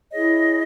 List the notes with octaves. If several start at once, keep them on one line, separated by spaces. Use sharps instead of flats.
E4 G#4 C#5 D#5